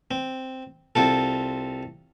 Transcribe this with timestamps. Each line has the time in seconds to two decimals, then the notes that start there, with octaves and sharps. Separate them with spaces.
0.11 C4
0.95 C2 C4 F4 A4